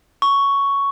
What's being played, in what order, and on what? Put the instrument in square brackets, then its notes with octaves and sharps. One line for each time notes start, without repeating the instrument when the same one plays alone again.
[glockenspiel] C#6